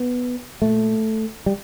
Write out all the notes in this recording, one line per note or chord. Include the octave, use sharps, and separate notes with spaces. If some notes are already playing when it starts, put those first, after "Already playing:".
Already playing: B3
A#2 A3
G3